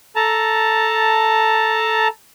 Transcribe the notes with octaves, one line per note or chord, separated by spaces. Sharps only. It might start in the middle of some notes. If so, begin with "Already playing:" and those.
A4 A5 A#5